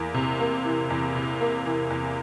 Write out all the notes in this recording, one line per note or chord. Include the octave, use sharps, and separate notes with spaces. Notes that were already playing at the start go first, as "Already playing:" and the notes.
Already playing: E2 A#3
C3
A#3
E3
E2
C3
A#3
E3
E2